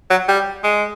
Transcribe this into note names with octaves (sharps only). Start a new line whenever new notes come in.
F#3
G3
G#3